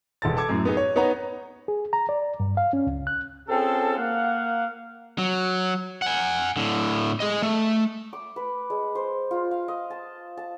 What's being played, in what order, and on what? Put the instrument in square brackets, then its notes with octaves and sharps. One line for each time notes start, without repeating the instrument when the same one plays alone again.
[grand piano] E1 A4 A6
A4 A5 D6 G#6
F#2 A2
B3 D#4 G#4
C#5
B3 D#4 C#5 F#5 A#5
[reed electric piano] G#4
A#5
D5
G2
F5
C#4
C#2
F#6
[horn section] C4 C#4 F4 G#4 A4
A#3 F5 F#5
[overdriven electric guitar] F#3
F#5 G#5
A2 D3
G#4 D#5
A3
[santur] D6
B4
G#3
C5
F4
F5
D#5
A5
A5